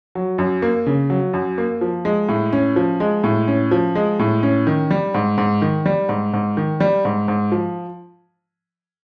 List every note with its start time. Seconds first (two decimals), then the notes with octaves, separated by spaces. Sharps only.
0.15 F#3
0.38 F#2
0.62 A#3
0.86 C#3
1.10 F#3
1.33 F#2
1.58 A#3
1.81 F3
2.05 G#3
2.28 A2
2.52 C#4
2.76 F3
3.00 G#3
3.24 A2
3.48 C#4
3.71 F3
3.95 G#3
4.19 A2
4.43 C#4
4.67 D#3
4.91 G3
5.14 G#2
5.38 G#2
5.62 D#3
5.86 G3
6.09 G#2
6.33 G#2
6.57 D#3
6.80 G3
7.05 G#2
7.28 G#2
7.52 F3